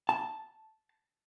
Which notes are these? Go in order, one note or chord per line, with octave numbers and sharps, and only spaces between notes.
A5